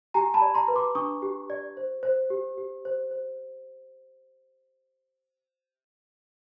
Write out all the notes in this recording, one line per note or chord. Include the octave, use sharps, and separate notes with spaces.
G4 G#5 A#5
A5 B5
D5
A#5 C6
B4
C6 D6
D4 C#6 D#6
G4
D5
C5
C5
G4
G4
C5
C5